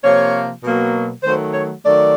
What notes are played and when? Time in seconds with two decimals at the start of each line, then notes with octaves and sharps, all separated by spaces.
0.03 C3 F3 A#3 C#5
0.63 B2 F#3 A#3
1.23 D#3 F#3 A3 C5
1.54 C#5
1.84 D#3 F#3 A3 D5